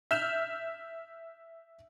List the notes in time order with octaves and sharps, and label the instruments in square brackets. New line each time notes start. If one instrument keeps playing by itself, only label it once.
[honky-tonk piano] E5 F6 G6 E7